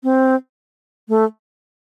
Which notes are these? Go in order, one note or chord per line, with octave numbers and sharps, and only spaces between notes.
C4
A3